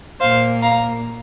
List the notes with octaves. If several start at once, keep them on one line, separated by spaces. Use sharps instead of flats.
A#2 A#3 C5 F5
F5 A#5